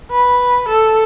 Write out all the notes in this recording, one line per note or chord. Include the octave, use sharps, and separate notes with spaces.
B4
A4